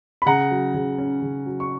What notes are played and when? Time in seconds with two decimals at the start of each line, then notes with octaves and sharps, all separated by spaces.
0.22 B5
0.26 C#3 F#5 A#5
0.51 F#3
0.74 C#3
0.98 C#4
1.22 C#3
1.46 F#3
1.60 C#6